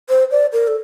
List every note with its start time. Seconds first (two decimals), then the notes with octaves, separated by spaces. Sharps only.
0.09 C5
0.31 D5
0.52 A#4
0.68 A4